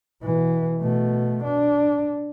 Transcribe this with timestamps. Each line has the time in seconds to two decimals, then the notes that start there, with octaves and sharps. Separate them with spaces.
0.22 B2 E3
0.81 B2 A3
1.44 D4